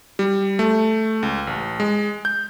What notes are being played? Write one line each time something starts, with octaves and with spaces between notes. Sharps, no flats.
G3
A3
C#2
A1
G#3
G6